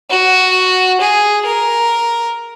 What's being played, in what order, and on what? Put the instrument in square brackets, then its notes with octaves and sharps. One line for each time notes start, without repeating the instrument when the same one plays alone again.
[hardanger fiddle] F#4
G#4
A#4